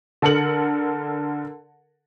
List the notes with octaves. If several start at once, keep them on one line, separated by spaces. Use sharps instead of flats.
D3 A4 A#4 C#7 F#7